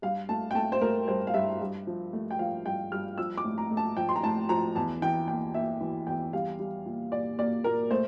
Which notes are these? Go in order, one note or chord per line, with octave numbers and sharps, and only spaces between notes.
G2 F5
A3 A5
G5
A3 A5
C5
A3 A#4
G2 C5
F5
G2 E5
G2
F3
A3
G5
F3 F5
G2 G5
G2 F6
F3 E6
D6
A2
A#5
A3
A5
F3 G5
C6
A#5
A2 A5
F3 A#5
E2 A5
E3 G5
A#3 G5
A#3 E5
E3
E2 G5
G3 F5
G3
A#2
A#2 D5
A#3 D5
A#2 A#4
A3 C5